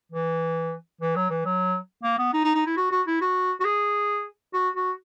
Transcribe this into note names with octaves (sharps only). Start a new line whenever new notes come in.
E3
E3
F#3
E3
F#3
A#3
B3
D#4
D#4
D#4
E4
F#4
F#4
E4
F#4
F#4
G#4
F#4
F#4